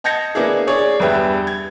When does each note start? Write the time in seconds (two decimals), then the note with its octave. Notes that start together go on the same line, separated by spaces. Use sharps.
0.04 D#5 A5 G6 G#6 A#6 C#7
0.35 A#3 B3 D4 E4 G#4
0.67 G#4 C#5 D5
1.00 E2 G2 G3 B4 E5 G5
1.47 G#6